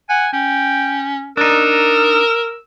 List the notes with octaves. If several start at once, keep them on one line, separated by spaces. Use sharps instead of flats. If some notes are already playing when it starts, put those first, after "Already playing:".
F#5 G#5
C#4 G5
D4 D#4 A#4 E6